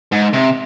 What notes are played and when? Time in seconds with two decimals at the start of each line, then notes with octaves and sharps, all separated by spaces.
0.12 G#2
0.33 C3